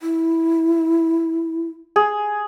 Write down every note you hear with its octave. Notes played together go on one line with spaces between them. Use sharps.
E4
G#4